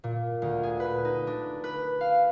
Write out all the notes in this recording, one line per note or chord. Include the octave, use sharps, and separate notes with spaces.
A#2
D2
G#4
B4
D#4
D4
B4
F5